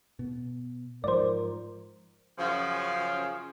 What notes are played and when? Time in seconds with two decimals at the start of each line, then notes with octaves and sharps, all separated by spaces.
0.19 B2
1.04 G#2 F3 A#4 C5 D5
2.38 F#2 C#3 F3